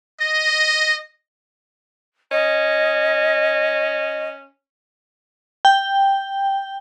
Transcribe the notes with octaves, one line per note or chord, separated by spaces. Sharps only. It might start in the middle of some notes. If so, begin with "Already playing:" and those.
D#5
C#4 D#5
G5